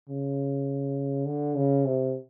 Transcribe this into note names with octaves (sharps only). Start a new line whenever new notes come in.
C#3
D3
C#3
C3